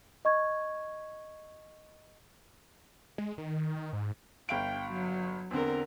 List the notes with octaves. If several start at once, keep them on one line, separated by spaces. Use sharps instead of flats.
D#5 C#6 G#6
G#3
D#3
D#3
G#2
G1 F5 G5 D7
F#3
E2 D3 C4 A#4